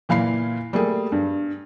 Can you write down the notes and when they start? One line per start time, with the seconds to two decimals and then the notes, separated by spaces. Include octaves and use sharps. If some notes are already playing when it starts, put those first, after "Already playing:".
0.09 A#2 E3 F5 B5 C7
0.73 G3 A3 A#3 G#4
1.12 G2